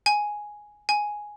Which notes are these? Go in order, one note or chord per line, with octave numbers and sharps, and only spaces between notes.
G#5
G#5